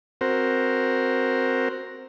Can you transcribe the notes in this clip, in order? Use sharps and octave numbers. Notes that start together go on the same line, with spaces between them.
C4 F#4 A#4 C5